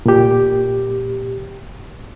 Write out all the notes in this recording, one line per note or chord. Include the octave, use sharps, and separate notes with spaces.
A#2 G4